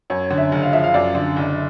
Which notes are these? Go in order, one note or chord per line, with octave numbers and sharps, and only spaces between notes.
F#2 C#5
D3
E5
F#1
F5
F3 E5
F5
F#2 D5
D3
F#1